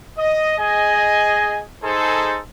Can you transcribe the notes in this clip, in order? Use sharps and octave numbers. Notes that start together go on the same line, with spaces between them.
D#5
G#4 D#5 G#5
D#4 G#4 A4 C5